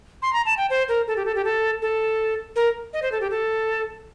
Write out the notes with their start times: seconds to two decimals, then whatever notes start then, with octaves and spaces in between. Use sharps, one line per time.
0.22 C6
0.33 A#5
0.46 A5
0.58 G5
0.70 C5
0.89 A#4
1.08 A4
1.17 G4
1.26 A4
1.36 G4
1.45 A4
1.82 A4
2.56 A#4
2.93 D#5
3.02 C5
3.12 A4
3.21 G4
3.31 A4